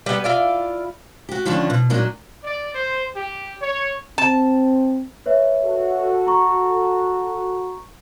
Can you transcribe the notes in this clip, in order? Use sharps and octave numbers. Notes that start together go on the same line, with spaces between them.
G3 B3
E4 F4 D5
F#4 G4
D3 D#3 F3 C#4 D4
B2
A#2 F#3 D4 D#4
D5
C5
G4
C#5
C4 A5
B4 C#5 E5
F#4 A4
A#5 C#6